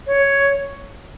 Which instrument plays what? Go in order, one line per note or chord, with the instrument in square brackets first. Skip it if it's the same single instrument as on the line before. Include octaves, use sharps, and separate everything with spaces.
[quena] C#5